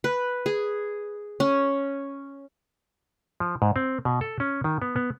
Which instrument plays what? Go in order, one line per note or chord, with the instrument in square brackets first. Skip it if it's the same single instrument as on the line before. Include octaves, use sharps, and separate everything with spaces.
[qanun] B4
G#4
C#4
[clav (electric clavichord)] F3
G#2
C4
B2
A4
C#4
D#3
B3
B3